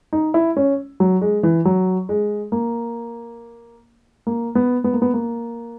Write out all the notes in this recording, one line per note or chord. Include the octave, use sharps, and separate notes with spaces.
D#4
E4
C#4
F#3
G#3
E3
F#3
G#3
A#3
A#3
B3
B3
A#3
B3
A#3